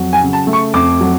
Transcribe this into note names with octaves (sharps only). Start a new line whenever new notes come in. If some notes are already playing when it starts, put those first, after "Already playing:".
Already playing: F2 F#3
G#5
C#3
A5
A3
C#6
F2 D6
F#3